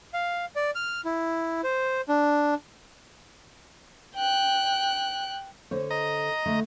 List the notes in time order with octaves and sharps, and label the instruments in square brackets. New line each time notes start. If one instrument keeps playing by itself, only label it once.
[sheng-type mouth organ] F5
D5
F6
E4
C5
D4
[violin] G5 F#6
[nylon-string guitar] D3 C5 C#5
[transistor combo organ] D#5 A#5
[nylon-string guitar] D3 A3